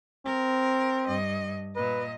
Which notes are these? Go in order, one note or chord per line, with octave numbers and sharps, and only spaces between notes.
C4 A#4
G2 D#5
A#2 B4 D#5